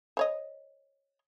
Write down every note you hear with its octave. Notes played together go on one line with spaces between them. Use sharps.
C5 C#5 D#5